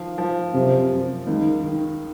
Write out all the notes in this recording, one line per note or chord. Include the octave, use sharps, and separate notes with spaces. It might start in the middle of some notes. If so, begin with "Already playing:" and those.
Already playing: D#3 F3
F3
F#2 C3
F#2
C#2 D#3
D#3